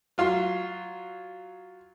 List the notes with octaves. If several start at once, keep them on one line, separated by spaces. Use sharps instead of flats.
F#3 F4 C6